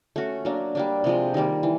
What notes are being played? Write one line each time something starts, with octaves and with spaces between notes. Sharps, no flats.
A3 C#4 F#4
F#3 A#3 D4
G3 A#3 D4
C3 F3 G#3
D#3 G3 A#3
E3